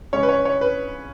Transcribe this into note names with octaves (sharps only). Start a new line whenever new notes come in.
C#3 G#3 C#4 C#5
B4
C#5
C#5
B4